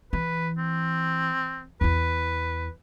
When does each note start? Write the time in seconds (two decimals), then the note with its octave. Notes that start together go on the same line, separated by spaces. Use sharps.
0.13 E3 B4
0.58 C4
1.81 E2 E4 B4